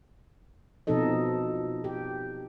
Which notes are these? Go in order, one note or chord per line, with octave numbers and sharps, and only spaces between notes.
B2 F3 C4 D#4 A4 D#5
G4